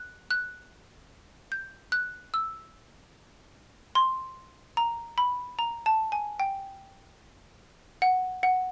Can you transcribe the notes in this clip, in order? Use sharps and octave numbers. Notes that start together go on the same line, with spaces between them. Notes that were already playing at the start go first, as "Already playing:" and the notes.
Already playing: F#6
F#6
G6
F#6
E6
C6
A#5
B5
A#5
A5
G#5
G5
F#5
F#5